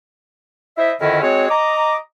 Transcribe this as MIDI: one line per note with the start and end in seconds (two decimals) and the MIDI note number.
0.77 0.91 64
0.77 0.91 72
0.77 0.91 75
0.77 0.91 76
1.00 1.19 41
1.00 1.19 50
1.00 1.19 51
1.00 1.19 61
1.00 1.19 64
1.00 1.19 75
1.22 1.49 56
1.22 1.49 60
1.22 1.49 66
1.22 1.49 73
1.49 1.96 75
1.49 1.96 82
1.49 1.96 86